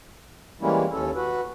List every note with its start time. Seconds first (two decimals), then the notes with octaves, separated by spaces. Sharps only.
0.61 E3 G3 G#3 A#3 C#4 E4
0.92 D#2 C#4 A4
1.16 F#4 B4